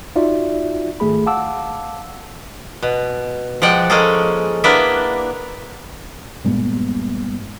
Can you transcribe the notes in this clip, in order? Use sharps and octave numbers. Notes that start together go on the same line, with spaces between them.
D#4 F4 F#4 D5 E5
G#1 A3 G#4 B5
F5 F#5 A5 D6 E6
B2
F3 G#3 D5 F#5 G5
G#3 A#3 C#4 G#4 A4
A#3 B3 D4 E4 D5 E5
G2 A#2 G#3 B3